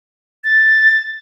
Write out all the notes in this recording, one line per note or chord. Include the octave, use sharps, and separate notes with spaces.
A6